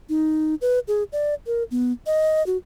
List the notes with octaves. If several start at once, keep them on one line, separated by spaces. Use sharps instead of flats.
D#4
B4
G#4
D5
A#4
B3
D#5
F#4